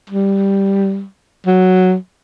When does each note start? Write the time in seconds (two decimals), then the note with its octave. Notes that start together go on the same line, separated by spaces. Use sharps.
0.10 G3
1.46 F#3